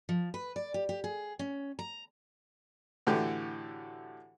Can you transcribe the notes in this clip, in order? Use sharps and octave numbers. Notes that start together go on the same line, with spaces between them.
F3
B4
D5
G4
G4
G#4
C#4
A#5
A2 D3 E3 F#4 G4